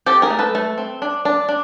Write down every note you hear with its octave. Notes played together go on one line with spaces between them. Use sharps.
C4 G4 A4
G#4 A#4
A3
A4 B4
A3
C4
D4
D4
D4